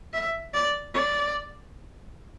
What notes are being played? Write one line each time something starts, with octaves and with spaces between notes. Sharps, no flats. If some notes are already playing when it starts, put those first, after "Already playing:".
E5
D5
D5